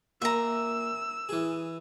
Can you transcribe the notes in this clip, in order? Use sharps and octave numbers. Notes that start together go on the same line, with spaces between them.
A#2 E5 A#5 E6
E3 G#4